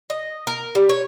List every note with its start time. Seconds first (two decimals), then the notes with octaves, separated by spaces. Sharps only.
0.10 D#5
0.47 A#4
0.75 G3
0.89 C#5